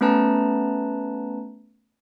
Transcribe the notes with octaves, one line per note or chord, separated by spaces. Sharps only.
A3 B3 C#4 B4 A5 A#5